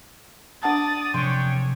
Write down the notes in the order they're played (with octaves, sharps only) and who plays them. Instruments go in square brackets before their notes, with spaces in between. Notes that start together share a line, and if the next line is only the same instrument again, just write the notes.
[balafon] D4 F#5 A5 [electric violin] D5 A6 [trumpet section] D#6
[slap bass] C3 F3 F#3 [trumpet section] C#4 D4 G5 [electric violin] C#5 [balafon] C6